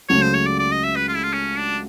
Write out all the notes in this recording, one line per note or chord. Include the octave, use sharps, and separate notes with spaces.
C#2 C#3 F#3 A3 C#5
C5
C#5
D5
D5
D#5
E5
B4
F4
E4
F4
C#4
D4